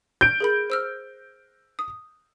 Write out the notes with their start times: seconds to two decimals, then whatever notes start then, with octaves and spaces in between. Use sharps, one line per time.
0.21 G6 D7
0.40 G#4 A#4 B5
0.70 C5 E6 F6
1.79 D#6